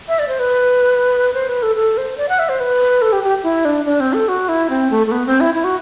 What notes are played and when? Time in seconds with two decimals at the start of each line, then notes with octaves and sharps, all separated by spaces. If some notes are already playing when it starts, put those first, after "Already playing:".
0.08 E5
0.19 D5
0.28 C5
0.39 B4
1.34 C5
1.48 B4
1.63 A4
1.76 A4
1.98 C5
2.17 D5
2.29 F#5
2.39 E5
2.49 C5
2.60 B4
3.02 A4
3.12 G4
3.24 G4
3.43 E4
3.65 D4
3.85 D4
4.00 C4
4.13 A4
4.28 F#4
4.49 E4
4.70 C4
4.91 A3
5.07 A3
5.12 B3
5.26 C4
5.40 E4
5.54 E4
5.64 F#4